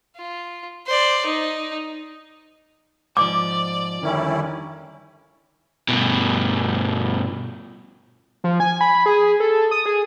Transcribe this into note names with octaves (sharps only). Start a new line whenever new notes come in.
F4
C5 D5
D#4
G#2 F3 D5 D6
F2 D3 D#3 G3 C#4 E4
G2 B2
F3
G#5
B5
G#4
A4
D#6
G#4